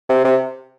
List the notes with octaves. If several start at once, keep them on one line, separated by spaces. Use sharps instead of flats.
C3
C3